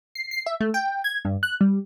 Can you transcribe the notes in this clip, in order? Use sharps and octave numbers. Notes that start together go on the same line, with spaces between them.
C7
C7
E5
A3
G5
G#6
G2
F#6
G3